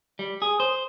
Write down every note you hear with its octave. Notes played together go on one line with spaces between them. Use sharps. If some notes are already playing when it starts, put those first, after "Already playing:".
G3
G#4
C5